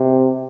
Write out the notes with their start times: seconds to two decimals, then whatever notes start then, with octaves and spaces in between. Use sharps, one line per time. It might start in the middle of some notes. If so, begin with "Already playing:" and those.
Already playing: C3